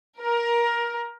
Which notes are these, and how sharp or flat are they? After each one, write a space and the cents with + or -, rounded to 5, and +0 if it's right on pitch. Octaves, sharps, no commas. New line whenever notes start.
A#4 +15